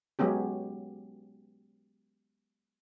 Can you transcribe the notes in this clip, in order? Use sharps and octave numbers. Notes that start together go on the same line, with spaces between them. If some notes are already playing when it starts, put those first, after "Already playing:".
F#3 G#3 B3 C#4 G4